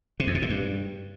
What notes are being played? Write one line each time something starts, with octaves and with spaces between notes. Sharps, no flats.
C3
F2
C3
A#2
G2